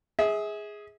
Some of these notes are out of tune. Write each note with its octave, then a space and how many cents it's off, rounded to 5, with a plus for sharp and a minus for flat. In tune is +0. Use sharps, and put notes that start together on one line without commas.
G#4 +0 E5 -35